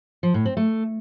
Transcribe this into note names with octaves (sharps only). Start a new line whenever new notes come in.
F3
A2
C4
A3